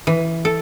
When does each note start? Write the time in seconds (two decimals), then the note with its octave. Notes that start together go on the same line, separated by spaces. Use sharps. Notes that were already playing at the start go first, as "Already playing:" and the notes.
0.07 E3
0.45 A4